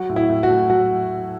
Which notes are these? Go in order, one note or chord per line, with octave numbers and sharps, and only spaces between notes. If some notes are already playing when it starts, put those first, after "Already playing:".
Already playing: F#3 F#4
A2
E4
A2
F#4
A3
F#3 F#4